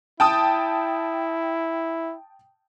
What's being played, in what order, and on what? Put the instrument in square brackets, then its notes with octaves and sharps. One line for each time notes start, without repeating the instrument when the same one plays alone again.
[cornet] E4 [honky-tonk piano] G5 A5 D#6